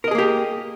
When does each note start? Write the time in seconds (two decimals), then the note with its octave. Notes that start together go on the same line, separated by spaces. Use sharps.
0.04 A#4
0.08 D#5
0.11 G#4
0.15 A#3
0.18 G4